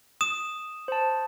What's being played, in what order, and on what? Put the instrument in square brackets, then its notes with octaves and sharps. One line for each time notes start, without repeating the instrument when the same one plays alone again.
[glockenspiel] D#6 E7
[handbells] C5 A5